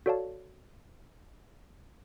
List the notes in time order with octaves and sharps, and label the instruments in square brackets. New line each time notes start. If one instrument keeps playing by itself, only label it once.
[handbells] F#4 A4 C#5 D5 F5 A5